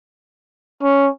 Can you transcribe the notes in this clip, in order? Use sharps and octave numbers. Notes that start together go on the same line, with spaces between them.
C#4